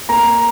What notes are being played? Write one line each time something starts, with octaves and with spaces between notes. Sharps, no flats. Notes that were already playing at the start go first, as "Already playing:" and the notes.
A#3 A#5